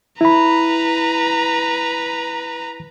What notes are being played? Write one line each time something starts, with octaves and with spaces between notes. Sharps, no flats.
E4 B4 A#5 B5